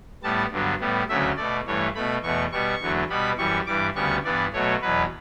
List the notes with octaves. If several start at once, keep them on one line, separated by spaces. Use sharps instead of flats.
A2 G3 B3 A5
G2 D3 F#3 B3
A2 G3 B3
D2 C#3 F#3 A3 E5
B2 A3 D5
G2 E3 A3 C#5
B2 A3 B5
E2 B2 A3 C#6
B2 G3 B3 C#6
E2 D3 F#3 A3
B2 G3 B3 B5
F#2 E3 G3 C#6
G2 E3 G3 D6
D2 C#3 G3 B3 C#6
G2 E3 B3 D5
B2 F#3 A3 C#5
E2 B2 F#3 B4